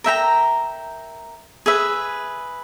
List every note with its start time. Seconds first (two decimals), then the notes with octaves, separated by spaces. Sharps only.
0.04 A#4 E5 G5 A#5
1.66 G#4 B4 E5